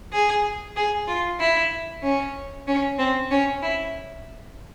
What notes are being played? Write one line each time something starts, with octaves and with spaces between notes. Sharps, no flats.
G#4
G#4
F4
E4
C#4
C#4
C4
C#4
E4